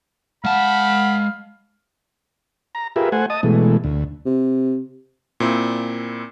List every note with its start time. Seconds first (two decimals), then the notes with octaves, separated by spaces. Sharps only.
0.45 G#3 F5 F#5 A5 B5
2.75 A#5
2.96 F4 G4 G#4 A#4 B4 E5
3.12 A3 C5 F#5 G#5
3.30 D#5 A5 D#6
3.43 B2 E3 G#3 A3
3.84 D2
4.26 C3
5.40 A#2 C4 E4